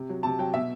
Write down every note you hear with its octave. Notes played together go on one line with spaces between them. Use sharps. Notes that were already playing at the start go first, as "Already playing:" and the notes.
Already playing: C3
F#3
C3 A5
F#3 G5
B2 E5